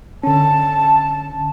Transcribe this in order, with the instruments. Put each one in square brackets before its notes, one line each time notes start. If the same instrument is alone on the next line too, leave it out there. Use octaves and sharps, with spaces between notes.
[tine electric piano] D3 C#4 [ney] A5